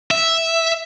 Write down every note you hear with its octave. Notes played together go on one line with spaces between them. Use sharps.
E5